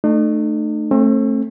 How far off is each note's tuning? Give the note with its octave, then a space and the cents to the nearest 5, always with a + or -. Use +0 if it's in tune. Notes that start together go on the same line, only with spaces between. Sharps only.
A3 +0 D#4 -45
A3 +0 C4 +40